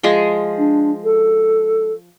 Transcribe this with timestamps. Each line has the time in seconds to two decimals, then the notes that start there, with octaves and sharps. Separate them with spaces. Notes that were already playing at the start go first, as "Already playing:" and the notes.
0.03 F3 G#3 G#4
0.58 D4
1.04 A4